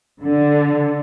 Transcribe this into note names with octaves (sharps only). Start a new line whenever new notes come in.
D3